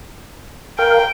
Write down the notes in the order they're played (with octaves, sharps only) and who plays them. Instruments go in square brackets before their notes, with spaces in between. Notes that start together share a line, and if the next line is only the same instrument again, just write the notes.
[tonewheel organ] A#4 F5 [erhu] G5